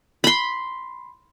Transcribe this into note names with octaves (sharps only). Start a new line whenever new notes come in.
B5 C6